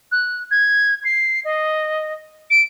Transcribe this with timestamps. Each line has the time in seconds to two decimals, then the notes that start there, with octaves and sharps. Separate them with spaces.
0.12 F#6
0.51 G#6
1.04 C7
1.45 D#5
2.50 D7